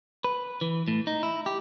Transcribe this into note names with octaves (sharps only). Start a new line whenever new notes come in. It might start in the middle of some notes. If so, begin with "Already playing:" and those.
B4
E3
A2
D#4
E4
G4